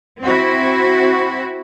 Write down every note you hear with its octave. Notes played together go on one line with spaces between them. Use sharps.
C4 E4 F#4